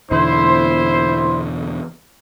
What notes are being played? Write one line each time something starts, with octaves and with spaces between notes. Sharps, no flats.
E2 B2 D3 E4 C5